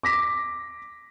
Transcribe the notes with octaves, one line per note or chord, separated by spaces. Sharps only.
D6 A#6 B6